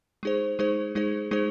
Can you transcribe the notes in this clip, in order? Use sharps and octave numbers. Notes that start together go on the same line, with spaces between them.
G#3 D#4 G#4 C5
G#3 D#4 G#4 C5
G#3 D#4 G#4 C5
G#3 D#4 G#4 C5